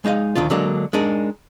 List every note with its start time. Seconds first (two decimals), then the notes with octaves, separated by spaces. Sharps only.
0.05 G#3 D#4 D#5 F5
0.35 D2 D#3 D4 F4
0.50 D3 F#3 G#3 A#3 D4
0.93 G#3 D4 D#4 G#4 A#4